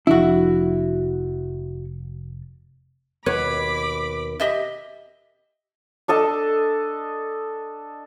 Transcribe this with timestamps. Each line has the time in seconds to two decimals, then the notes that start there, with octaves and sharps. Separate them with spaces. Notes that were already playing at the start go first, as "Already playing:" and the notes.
0.07 F1 F3 D4 E4 F#4
3.26 D#2 B2 B4 C#5 B5 D6
4.40 G4 D#5 E5
6.08 D4 A4 D#5 A5